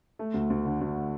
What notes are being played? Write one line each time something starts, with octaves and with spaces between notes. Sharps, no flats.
A3
D2
D2
D3
D2